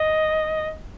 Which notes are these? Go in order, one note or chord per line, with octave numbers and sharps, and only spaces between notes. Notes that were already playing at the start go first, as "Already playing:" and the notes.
Already playing: D#5